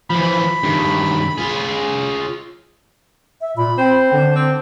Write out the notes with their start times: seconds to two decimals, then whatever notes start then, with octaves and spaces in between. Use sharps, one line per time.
0.10 E3 F3 B5
0.63 G2 D#3
1.38 F4 G#4
3.41 E5
3.57 A#2 B5
3.78 C4 C5
4.12 D3 D4
4.36 C4